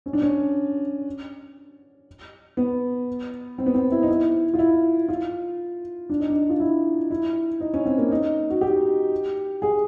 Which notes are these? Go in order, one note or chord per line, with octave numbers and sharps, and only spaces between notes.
C#4
D4
C#4
B3
C4
B3
C4
E4
D#4
E4
F4
E4
F4
D4
D#4
D4
F4
E4
E4
D#4
C#4
C4
A#3
D#4
F#4
G4
G#4